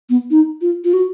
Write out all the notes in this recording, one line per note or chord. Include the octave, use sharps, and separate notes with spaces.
B3
D#4
F4
F4
F#4